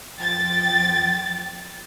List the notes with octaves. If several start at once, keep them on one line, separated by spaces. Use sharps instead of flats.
F2 F3 G5 A6